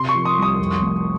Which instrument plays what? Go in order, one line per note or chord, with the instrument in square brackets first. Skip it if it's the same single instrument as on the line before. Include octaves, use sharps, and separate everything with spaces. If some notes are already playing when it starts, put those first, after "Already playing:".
Already playing: [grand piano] C3 [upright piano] C6
[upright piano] C#6
[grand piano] F3
[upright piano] D#6
[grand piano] C2
[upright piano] D#6
[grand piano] F2
F1